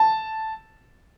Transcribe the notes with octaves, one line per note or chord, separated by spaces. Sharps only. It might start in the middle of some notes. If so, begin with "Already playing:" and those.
Already playing: A5